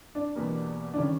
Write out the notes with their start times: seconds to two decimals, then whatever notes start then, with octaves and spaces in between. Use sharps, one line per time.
0.15 D4
0.35 E2 B2 G3 A#3
0.94 D4
0.97 D#3 G3 C#4